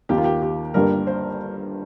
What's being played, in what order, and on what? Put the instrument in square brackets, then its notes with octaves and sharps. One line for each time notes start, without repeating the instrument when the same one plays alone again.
[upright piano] D#2 D#3 A#3 G4
F4
G4
G4
G1 G2 G3 A#3 A#4
C5